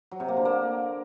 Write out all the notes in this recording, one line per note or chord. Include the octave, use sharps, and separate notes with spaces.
F#3
C3
A#3
D3
A#3